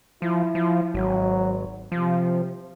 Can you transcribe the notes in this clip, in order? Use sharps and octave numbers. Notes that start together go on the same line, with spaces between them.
F3 E4
F3
G#1 F#3
C3 F3